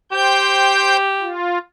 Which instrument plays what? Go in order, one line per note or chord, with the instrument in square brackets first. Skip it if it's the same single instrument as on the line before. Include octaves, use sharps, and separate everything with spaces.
[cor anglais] G4 [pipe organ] C5 G5 G6
[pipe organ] F4